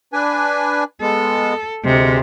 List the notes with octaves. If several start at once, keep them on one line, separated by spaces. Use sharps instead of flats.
D4 B4 G#5
G#3 B3 A4
D2 C3 G#3